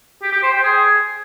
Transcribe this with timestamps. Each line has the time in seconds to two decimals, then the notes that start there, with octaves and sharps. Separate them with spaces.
0.22 G4
0.32 G4
0.43 C5
0.53 G5
0.63 G#4